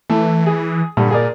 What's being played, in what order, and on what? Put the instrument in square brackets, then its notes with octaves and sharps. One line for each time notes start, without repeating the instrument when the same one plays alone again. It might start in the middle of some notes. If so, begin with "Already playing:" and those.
[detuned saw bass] E3 [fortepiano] A3
[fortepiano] G#4
[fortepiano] G2 D3 [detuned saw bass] A#2
[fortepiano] G#4 A#4 D5